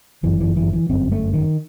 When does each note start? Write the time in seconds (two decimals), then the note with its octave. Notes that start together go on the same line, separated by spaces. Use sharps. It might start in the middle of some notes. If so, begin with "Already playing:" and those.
0.23 G1 F#2 E3
0.41 E3
0.57 E3
0.73 E3
0.89 G1 F#2 C4
1.12 A3
1.34 D#3